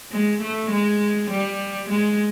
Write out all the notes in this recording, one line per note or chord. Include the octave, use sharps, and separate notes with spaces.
G#3
A3
G#3
G3
G#3